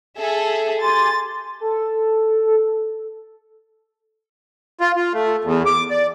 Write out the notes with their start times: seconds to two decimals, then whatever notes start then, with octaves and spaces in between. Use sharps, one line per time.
0.19 G#4 A4 E5
0.81 G4 G#5 C6 A6
1.61 A4
4.81 F4
4.96 F4
5.14 A3
5.44 E2
5.66 D6
5.90 D5